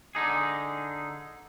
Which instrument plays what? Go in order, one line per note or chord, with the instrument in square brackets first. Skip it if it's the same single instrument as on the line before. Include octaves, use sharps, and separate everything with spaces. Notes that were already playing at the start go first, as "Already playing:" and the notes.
[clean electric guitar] D3 D#4 G#4